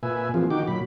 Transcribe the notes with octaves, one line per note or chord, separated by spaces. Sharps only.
A#2 B4 E5 G#5
E3 F3 A#3 C4 F4 G#4
D#3 D#4 F#4 G5 D6
A#2 F#3 B5